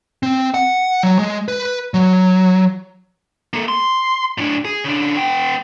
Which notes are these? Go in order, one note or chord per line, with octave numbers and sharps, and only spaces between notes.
C4
F#5
F#3
G#3
B4
F#3
A#3 A4
C6
A2 D4
G#4
C#3 D4
B3 G5